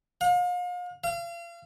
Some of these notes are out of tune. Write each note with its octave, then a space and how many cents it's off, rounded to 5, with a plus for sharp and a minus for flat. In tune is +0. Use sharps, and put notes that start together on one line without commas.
F5 +40
F5 -35